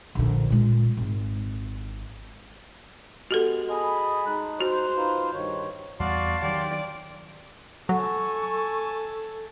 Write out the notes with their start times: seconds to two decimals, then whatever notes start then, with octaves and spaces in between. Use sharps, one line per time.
0.15 A#1 D3
0.50 A#2 G#3
0.97 G#1
3.31 G#3 B3 F#4 G4 A4
3.69 G#4 D#5 G#5 A5 B5
4.26 G#3 D#4 F#6
4.61 F#4 C5
4.97 D#4 F4 B4
5.34 G2 D#3 C#5
6.00 E2 G3 F#4 D5 F5 A5 C6
6.42 D#3 F#3 G4 D5
7.89 F#3 A4 G#5 A5 C#6